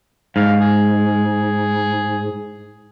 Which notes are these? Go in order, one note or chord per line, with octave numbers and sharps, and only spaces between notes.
G#2 F5
G#4